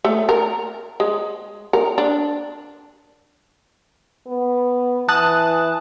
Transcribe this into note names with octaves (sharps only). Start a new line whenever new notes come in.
A3
A#4
G#3
A#4
D4
B3
E3 A5 D#6 F#6